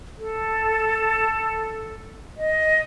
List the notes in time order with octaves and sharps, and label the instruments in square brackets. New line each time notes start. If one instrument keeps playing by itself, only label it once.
[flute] A4
D#5